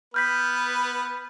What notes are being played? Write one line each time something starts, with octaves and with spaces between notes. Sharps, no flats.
B3 B4 F6 G6 B6